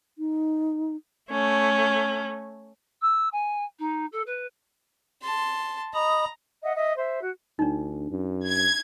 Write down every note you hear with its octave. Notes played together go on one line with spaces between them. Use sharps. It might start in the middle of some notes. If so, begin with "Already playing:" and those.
D#4
A3 C#4
E6
G#5
D#4
A4
B4
A5 C6
D#5 A#5 B5 D#6
D#5 E5 F#5
D#5 E5
C5 E5
F#4
D2 D4 D#4
F#2
G#6